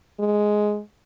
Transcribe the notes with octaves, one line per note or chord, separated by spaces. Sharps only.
G#3